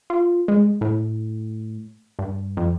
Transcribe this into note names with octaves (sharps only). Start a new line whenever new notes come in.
F4
G#3
A2
G2
F2